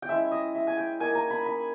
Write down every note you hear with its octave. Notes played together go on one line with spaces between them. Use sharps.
G5
G#3 C#4 E4 E5
D#5
E5
G#5
G5
A#3 D#4 G#5
A#5
B5
B5